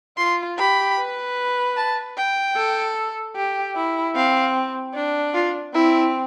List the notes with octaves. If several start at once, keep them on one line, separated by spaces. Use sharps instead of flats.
F4 C6
G4 B5
B4
A5
G5
A4
G4
E4
C4 F5
D4
F4
C4 E4